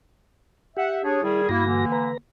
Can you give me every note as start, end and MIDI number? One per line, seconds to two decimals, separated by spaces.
0.77 1.22 67
0.77 0.98 76
0.77 0.98 78
1.04 1.20 62
1.04 1.20 68
1.04 1.20 73
1.23 1.47 51
1.23 1.47 55
1.23 1.42 64
1.23 1.47 68
1.49 1.85 43
1.49 1.61 58
1.49 1.61 64
1.49 1.85 66
1.49 1.85 94
1.65 2.10 50
1.65 2.10 52
1.65 2.10 58
1.92 2.17 71
1.92 2.17 82